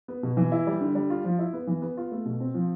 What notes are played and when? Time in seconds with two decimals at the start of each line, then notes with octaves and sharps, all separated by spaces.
0.08 B3
0.23 B2
0.37 E3
0.52 E4
0.67 G3
0.81 D3
0.95 G3
1.10 F4
1.24 F3
1.39 E4
1.53 B3
1.67 E3
1.82 B3
1.97 F4
2.12 A3
2.26 B2
2.40 C4
2.54 F3